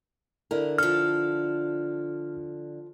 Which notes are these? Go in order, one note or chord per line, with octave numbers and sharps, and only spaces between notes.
D3 E4 A#4
F3 A4 F6